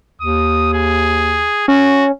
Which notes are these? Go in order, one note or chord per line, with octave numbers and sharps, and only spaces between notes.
D#2 D#6
G#4
C#4 F#4